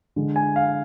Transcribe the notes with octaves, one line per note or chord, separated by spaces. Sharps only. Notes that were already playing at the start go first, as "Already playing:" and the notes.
D3 G#3
G#5
F5